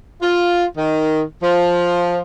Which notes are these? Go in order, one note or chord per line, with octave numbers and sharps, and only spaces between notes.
F4
D#3
F3